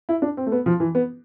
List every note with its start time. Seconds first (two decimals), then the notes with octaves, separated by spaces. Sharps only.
0.09 E4
0.22 D4
0.37 C4
0.46 A3
0.52 B3
0.66 F3
0.80 E3
0.95 B3